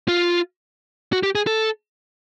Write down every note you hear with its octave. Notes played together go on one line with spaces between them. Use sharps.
F4
F#4
G4
G#4
A4